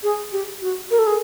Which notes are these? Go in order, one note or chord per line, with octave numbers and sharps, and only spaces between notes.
G#4
G4
F#4
A#4
A4
G#4